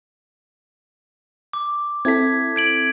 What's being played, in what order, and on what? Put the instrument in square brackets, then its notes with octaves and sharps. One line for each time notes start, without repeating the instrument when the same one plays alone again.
[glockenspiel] D6
[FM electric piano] C4 E4 A4 [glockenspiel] G#6 B6
[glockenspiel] G#6 D7 F#7